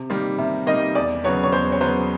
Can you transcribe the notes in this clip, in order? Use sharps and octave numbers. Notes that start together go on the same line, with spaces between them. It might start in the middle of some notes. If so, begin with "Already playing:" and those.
Already playing: C3
D#3 G3 A#3
C3 E5
D#3 G3 A#3 D#5
E2 D5
C#3 F#3 B3 C#5
C#5
E2 C5
C#5
C#3 F#3 B3 C5